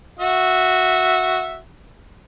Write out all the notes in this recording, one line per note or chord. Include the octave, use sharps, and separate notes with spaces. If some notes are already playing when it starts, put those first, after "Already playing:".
F#4 E5